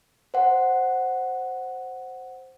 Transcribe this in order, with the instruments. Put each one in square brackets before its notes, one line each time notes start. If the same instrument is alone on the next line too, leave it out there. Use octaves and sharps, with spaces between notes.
[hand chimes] C5 F#5